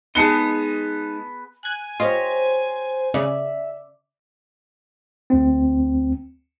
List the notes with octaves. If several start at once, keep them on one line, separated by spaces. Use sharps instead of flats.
G#3 B3 D#4 G#4 B4 A5 C#7 G7
G#5 F#6 G#6
F4 G4 C5 C#5 D#5
C#3 D5 E5
D2 C4